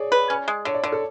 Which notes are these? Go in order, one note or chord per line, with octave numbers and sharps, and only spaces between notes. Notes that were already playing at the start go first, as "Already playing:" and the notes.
Already playing: G#4 C#5 D5
B4
C#4
G#3
D3 C#5
D5
D3 C#5
A4